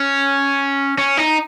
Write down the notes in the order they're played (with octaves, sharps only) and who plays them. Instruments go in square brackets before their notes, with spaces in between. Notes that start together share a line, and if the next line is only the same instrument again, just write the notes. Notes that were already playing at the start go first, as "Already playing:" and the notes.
Already playing: [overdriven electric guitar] C#4
C#4
D#4